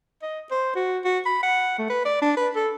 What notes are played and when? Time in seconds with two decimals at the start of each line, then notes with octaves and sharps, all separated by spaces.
0.23 D#5
0.51 C5
0.76 F#4
1.05 F#4
1.26 B5
1.43 F#5
1.78 A3
1.90 B4
2.05 D5
2.22 D4
2.37 B4
2.56 A4